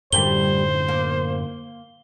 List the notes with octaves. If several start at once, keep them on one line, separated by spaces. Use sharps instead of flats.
F#2 A2 D3 G3 G4 A#4 C5 G7
A#3